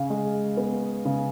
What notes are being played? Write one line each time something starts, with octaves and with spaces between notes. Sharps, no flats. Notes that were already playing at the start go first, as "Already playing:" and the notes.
Already playing: C#3 F5
G#3
B3
C#3